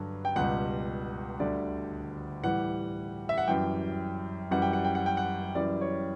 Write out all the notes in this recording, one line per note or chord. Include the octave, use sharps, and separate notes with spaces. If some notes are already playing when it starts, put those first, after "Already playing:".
Already playing: G2 D3 F#3
G5
C#2 B2 G3 F#5
D2 D3 G3 D5
A2 E3 G3 F#5
E5
F#5
F#2 E3 G3 G5
F#2 E3 G3 F#5
G5
F#5
G5
F#5
G5
F#5
F#2 E3 G3 D5
C#5